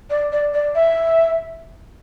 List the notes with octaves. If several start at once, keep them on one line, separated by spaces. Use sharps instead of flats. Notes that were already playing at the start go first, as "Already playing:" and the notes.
D5
D5
D5
E5